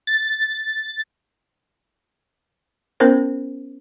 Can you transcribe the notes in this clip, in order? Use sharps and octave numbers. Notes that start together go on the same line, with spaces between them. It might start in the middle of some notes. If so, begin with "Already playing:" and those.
A6
B3 C#4 E4 A#4 C5